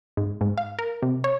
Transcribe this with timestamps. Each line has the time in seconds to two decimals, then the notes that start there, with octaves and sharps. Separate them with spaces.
0.17 G#2
0.41 G#2
0.58 F5
0.79 A#4
1.02 C3
1.24 C#5